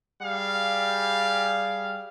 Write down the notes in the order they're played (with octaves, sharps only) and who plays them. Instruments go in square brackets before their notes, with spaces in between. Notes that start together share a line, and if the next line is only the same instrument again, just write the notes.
[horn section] G3 G#4 F5